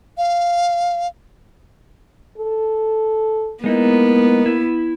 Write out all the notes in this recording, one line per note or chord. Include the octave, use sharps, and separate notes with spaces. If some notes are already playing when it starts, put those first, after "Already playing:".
F5
A4
G#3 A#3 B3 D#4 E4
E4